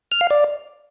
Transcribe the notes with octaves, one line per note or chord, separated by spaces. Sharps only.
F6
F5
D5